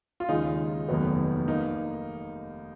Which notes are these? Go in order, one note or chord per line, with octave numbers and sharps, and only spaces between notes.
F4
D#2 C#3 G#3 D#4
F1 D#2 D#3 F#3 B3
A#3 D#4